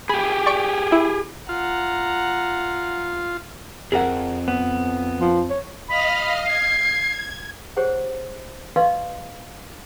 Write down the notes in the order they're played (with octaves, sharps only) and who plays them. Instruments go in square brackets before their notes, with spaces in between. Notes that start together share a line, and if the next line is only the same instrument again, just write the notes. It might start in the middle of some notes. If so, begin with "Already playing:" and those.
[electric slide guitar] G4 G#4 [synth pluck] B5
[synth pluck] D5 C#6 D7
E4
[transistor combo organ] F4 [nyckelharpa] F#5 A#5
[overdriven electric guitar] F2 [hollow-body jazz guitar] G#4 A#4 F#5
[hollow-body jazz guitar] B3
[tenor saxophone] F3
C#5
[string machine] D#5 F5 F6 [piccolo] B5
[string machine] G#6 [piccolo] C7
[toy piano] G4 G#4 C5 C#5 F#5
B4 D5 D#5 F5 C6 C#6